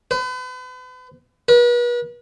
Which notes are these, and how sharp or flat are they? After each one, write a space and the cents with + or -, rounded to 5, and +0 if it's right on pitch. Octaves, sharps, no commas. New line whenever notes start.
B4 +40
B4 -40